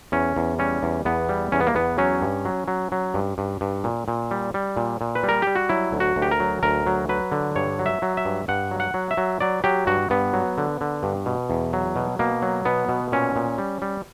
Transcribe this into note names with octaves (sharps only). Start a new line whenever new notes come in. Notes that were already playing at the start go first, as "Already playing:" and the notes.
E2 C#4
E2
G3 C#4
E2
E2 B3
G3
E2 C#4
B3
A#3
E2 B3
F#3 C#4
G2
F#3
F#3
F#3
G2
G2
G2
A#2
A#2
G3
G3
A#2
A#2
B4
G3
A#4
G3 G4
F#4
F#3 E4
D2
F#4
D2
G4
A#4
F#3
D2 A#4
F#3
F#3 B4
D3
G2 C#5
F#3
E5
F#3
E5
G2
G2 F#5
F#3
F#5
F#3
E5
F#3
F#3 D5
F#3 G4
G2 F#4
G2 B3
F#3
D3
D3
G2
B2
E2
F#3
B2
B2 A#3
F#3
B2 B3
B2
A#2 C#4
A#2
G3
G3